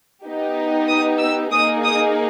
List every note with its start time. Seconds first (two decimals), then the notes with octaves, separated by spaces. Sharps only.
0.25 B3 D#4 G4
0.88 D#6
1.20 E6
1.52 A#3 D#4 G#4 D#6
1.84 D#6